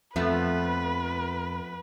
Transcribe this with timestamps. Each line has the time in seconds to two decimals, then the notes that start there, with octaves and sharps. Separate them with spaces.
0.16 F2 F3 A3 B3 B4